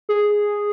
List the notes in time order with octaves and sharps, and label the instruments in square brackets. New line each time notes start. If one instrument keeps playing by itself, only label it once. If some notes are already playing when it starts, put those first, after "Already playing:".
[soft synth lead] G#4